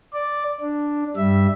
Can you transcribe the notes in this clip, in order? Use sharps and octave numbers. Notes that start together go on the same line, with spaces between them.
D5
D4
G2 G3 E5